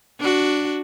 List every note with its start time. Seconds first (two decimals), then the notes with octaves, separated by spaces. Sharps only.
0.19 D4 F#4